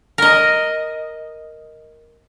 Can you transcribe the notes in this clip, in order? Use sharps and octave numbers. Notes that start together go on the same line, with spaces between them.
A#4 D#5